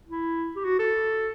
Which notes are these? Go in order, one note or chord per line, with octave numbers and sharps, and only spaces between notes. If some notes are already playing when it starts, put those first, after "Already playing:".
E4
G4
F#4
A4